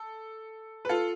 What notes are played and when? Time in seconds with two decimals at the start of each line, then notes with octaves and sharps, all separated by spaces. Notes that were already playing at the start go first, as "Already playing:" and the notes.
Already playing: A4
0.85 B4
0.89 F4 A4